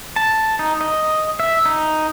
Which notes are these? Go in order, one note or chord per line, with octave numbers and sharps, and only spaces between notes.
A5
D#4
D#5
E5
D#4